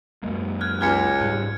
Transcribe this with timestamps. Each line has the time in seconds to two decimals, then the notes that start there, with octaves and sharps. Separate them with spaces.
0.23 F#2 G#3 A#3
0.61 F6 F#6 G#6
0.81 C#2 F6 G#6 C#7
1.21 G#2 G3